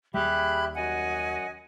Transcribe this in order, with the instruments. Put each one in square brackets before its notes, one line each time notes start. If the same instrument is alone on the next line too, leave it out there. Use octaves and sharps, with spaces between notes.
[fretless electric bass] D#2 G3 [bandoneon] G4 E5 [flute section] G#4 B5 F#6
[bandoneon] F#2 F#5 [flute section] F#4 D#5 G#5